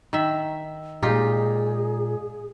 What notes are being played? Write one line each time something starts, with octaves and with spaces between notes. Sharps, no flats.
D#3 E5
A#2 G#3 D#4 F4 G4 G#4